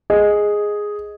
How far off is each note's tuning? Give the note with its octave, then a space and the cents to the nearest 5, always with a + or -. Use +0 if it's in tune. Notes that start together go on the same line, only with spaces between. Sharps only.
G#4 +0 D#5 +0